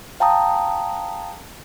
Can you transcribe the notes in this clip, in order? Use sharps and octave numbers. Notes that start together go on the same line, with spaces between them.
F5 G5 A5 A#5 D#6